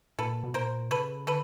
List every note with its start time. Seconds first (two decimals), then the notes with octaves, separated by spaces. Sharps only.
0.19 A#2 A4 B4
0.44 B2
0.54 A#2 A#4 C5
0.91 C#3 A4 B4
1.27 D3 A4 B4